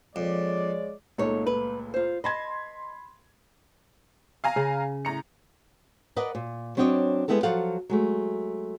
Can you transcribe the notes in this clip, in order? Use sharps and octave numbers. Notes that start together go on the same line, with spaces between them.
F2 G#3 C#5 D5
C#2 A#2 A3 D#4 C#5
B4
F4 C5
D#5 A5 B5 C6 G#6
F5 G#5 A#5
C#3
A2 A#5 C#7
A#4 B4 D5 D#5 F#5
A#2
F#3 C4 D4 C#5 D#5
G3 G#3 B3 E4 F#4 A4
F3 F#3 A4 F5 F#5
F#3 G#3 A3